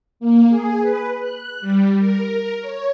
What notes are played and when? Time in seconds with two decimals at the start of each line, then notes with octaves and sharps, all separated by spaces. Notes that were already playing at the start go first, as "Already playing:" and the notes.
0.20 A#3
0.49 G#4
0.81 B4
1.19 F#6
1.60 G3
1.98 A#4
2.61 C#5